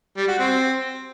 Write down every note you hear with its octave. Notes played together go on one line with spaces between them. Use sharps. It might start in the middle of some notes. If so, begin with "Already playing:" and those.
G3
F#4
C4